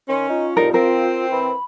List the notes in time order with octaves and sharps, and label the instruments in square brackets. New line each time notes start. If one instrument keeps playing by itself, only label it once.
[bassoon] D#3 [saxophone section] C#4 [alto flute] C6
[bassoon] D#4 [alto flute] F4
[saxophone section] F2 A2 D#4 [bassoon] G3 [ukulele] A#4
[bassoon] F3 [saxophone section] C4 [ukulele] A#4
[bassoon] E3 [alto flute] B5